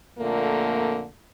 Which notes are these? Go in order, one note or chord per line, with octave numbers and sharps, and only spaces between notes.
F2 A#2 D3 A3 A#3